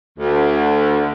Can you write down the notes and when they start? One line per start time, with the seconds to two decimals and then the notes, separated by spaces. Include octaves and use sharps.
0.19 D2